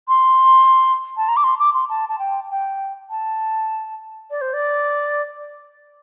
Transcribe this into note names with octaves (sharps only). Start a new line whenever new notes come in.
C6
A5
A#5
D6
C6
D6
C6
A5
A5
G5
G5
A5
D5
C5
D5